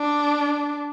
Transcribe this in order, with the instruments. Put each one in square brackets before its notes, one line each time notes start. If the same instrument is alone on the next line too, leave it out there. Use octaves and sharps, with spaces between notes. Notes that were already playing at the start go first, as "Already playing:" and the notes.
Already playing: [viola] D4